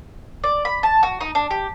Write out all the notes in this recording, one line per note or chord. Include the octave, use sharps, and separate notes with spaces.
D5
B5
A5
F#4
D#4
D4
G4